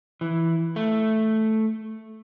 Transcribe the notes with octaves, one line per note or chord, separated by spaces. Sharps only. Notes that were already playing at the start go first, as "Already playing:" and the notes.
E3
A3